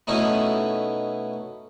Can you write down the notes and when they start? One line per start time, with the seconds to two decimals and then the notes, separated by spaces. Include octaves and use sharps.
0.07 B2 A3 C#4 D#4 E4